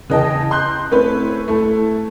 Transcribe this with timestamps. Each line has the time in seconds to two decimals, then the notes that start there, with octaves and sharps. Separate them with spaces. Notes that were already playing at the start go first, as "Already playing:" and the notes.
0.10 C#3 E3 D#5 G5 A5
0.51 C6 F#6 G6
0.91 A3 C4 C#4 E4 B4
1.48 A3 E4 A4